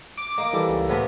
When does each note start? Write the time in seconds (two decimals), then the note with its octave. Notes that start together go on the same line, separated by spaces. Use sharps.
0.18 D6
0.38 A#3 D#5
0.53 E3 G3 A4
0.68 C#2
0.89 A2 C3 B3